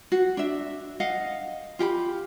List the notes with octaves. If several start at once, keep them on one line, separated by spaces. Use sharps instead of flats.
F#4
D4 E5
D#5 F5 F#5
F4 G4 G5 B5